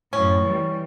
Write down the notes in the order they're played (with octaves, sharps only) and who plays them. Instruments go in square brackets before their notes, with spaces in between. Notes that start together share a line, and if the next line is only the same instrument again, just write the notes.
[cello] F#2 A2 [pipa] C#4
[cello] E3 G3